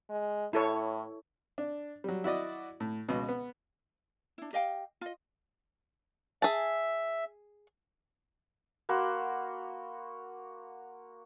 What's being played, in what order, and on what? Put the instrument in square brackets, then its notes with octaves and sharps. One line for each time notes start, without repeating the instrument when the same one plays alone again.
[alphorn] G#3
[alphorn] A2 [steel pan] E4 A4 C#5
[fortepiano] D4
F#3 G3
E4 F#4 D5 D#5
A2
C#2 B2
B3
[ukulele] D4 E4
G4 D#5 F5 G5
F4 D#5
[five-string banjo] G#4 A5 [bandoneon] E5
[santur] A#3 F#4 B5 C6